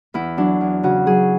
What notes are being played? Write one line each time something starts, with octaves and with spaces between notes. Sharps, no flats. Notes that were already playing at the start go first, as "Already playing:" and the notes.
E2 E4
F#3 D4
E2
C#3 F#4
F#3 G#4